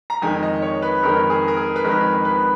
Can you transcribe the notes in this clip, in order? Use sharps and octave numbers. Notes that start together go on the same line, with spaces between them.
A#5
F2 D#3 G#3 G#5
D#5
C#5
B4
F2 D#3 G#3 A#4
G#4
A#4
G#4
B4
F2 D#3 G#3 A#4
B4